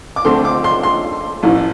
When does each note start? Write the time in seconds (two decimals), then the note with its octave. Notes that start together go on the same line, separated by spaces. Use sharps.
0.16 D6
0.25 D2 D3 A3 C4 C6
0.45 D6
0.64 C6
0.83 C6
1.43 A1 A2 E3